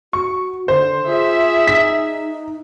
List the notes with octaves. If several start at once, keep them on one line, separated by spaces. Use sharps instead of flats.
F#4 C#6
D3 C5
F4 G#4 E5
D#4 B6